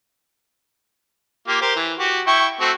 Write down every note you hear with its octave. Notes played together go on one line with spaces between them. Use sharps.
A#3 F4 G4
G4 A#4 C5
E3
F#4 G4
E4 G5 C#6
A3 C4 F#4